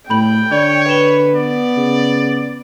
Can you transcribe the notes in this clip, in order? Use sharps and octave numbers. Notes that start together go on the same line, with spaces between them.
A2 G5 B5 G6 F#7
D3 C#5 D5
B4 E7 G7
B3 D5
C#3